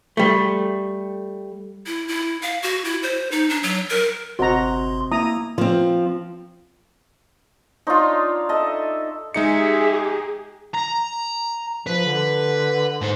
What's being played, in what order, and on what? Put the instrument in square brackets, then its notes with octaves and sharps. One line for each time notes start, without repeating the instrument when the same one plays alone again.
[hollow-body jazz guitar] G3 A3
[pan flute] E4
E4
F5
F#4
E4
C5
D#4
D4
F#3
A#4
[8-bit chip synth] G1 C6 [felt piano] C3 C5 D#5 [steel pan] F#4 A#5
[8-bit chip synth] A#3 [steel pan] E4 A#5 D#6
[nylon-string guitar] F3 C4
[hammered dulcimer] D4 C#5 C6 [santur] D#4 F4
[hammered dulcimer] A4 E5 A5 [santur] D#5
[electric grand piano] G#3 D#4 C#7 [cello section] G4 G#4 [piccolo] E5
[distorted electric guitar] A#5
[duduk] F3 [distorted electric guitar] B4
[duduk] D3
[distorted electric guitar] G#2 C5